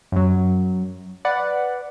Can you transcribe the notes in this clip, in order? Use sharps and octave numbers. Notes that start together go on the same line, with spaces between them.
F#2 F#3
B4 D5 F#5